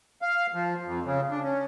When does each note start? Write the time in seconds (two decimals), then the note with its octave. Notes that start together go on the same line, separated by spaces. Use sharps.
0.22 F5
0.54 F3
0.85 F2
1.05 C#3
1.31 D4
1.44 C#4